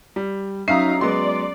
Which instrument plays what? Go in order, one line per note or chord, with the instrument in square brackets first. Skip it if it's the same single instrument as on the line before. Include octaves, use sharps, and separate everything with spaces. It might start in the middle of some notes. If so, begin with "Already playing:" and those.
[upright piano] G3
[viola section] F#3 D#4 [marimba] C#4 [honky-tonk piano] E5 F5 A#5 [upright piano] C7
[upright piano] F#3 G#3 B3 [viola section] D5 [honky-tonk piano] C6